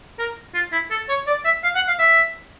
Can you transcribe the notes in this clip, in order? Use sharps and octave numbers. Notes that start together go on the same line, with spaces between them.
A#4
F4
E4
A4
C#5
D5
E5
F5
F#5
F5
E5